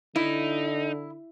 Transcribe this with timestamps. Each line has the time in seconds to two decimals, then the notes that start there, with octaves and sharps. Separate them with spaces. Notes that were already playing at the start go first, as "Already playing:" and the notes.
0.16 D3 D#4 E4